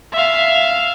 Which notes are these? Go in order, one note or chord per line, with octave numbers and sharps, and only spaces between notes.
E5 F5